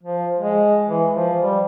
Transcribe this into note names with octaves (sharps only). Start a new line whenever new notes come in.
F3
G#3
E3
F3
G3